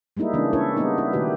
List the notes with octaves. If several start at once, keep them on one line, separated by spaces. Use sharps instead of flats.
G3 G#3 A#3 D#4 E4
C#3 E3 G#3 A#3 C#4 D4
C#4 D4 E4 A4 A#4 C#5
G3 G#3 A#3 B3 D#4 E4
E4
B2 D#3 A3 F#4 G4 B4